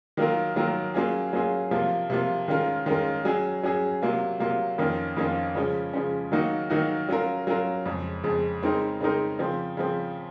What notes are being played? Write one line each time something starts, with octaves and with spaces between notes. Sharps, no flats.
D#3 F#3 A#3 F4 A#4
D#3 F#3 A#3 F4 A#4
F#3 A#3 C#4 F4 G#4
F#3 A#3 C#4 F4 G#4
C3 F3 A#3 F4
C3 F3 A#3 F4
D#3 G#3 C#4 F4 A#4
D#3 G#3 C#4 F4 A#4
F#3 C#4 G#4
F#3 C#4 G#4
C3 F#3 A#3 F4
C3 F#3 A#3 F4
F2 D#3 A#3 C#4 F4
F2 D#3 A#3 C#4 F4
C#3 F3 G#3 C#4
C#3 F3 G#3 C#4
D#3 F#3 A#3 D#4 F#4
D#3 F#3 A#3 D#4 F#4
F#3 C#4 F4 A#4
F#3 C#4 F4 A#4
F2 C#3 G#3
F2 C#3 G#3
C#3 G#3 C4 D#4 A#4
C#3 G#3 C4 D#4 A#4
C#3 F3 C4
C#3 F3 C4